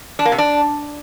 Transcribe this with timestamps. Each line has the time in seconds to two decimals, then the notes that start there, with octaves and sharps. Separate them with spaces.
0.19 D4
0.25 A#3
0.32 C3
0.38 D4